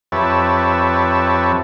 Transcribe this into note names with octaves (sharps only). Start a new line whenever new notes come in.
F2 G4 B4 C#5 E5 A5